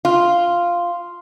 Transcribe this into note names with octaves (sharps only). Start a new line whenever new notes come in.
F4